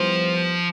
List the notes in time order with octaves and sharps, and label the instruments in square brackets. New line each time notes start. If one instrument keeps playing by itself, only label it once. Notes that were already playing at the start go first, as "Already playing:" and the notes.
Already playing: [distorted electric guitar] F3 [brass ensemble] G3 B3 E4 G4 C5